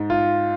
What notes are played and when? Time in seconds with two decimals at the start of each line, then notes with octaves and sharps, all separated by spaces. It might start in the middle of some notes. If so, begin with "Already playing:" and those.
Already playing: G#2
0.10 F4